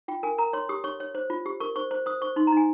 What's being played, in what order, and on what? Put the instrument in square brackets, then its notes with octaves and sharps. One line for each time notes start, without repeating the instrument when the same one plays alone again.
[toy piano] F4 G5
A#4 G#5
A#4 A#5
C#5 C6
G4 D#6
C#5 C#6
C#5
C5
F4
G4
A#4 C#6
C5 C#6
C5
C5 D#6
C5 C#6
D#4 C6
A#5
D#4 G#5